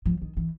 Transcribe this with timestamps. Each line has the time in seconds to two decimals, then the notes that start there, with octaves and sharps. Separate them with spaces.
0.06 F3
0.22 D#3
0.37 E3